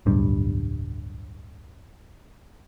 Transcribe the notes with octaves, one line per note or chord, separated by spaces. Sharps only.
D1 B1 G2 G3